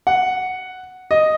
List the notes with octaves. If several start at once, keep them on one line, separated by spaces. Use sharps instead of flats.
F#5
D#5